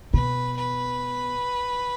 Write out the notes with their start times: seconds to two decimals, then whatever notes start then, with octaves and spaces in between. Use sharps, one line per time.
0.14 B2 B4
0.57 B4